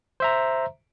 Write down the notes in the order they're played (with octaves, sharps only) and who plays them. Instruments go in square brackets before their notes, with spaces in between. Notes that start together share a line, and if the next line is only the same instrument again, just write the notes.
[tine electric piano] C5 E5 A#5